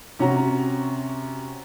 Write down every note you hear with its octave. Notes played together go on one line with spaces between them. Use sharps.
C3 C#4 F#4 A#5